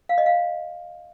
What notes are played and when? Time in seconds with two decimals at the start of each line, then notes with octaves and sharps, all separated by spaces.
0.09 F5
0.18 D#5
0.26 F5